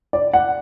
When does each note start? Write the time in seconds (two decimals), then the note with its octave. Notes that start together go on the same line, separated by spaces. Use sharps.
0.13 D5
0.33 F#5